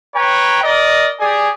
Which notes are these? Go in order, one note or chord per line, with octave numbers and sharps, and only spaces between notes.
B4 C#5 G5 A#5
A#4 D5 D#5
G4 G#4 D5 G#5